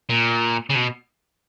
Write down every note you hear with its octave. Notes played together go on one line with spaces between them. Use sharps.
A#2
C#3
B2